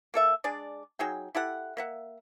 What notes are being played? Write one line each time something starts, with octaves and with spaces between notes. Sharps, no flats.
A#3 A4 E5
G#3 D4 G#4 D5
F#3 D#4 G#4 G5
E4 G4 A4 F#5
A#3 E5 F#5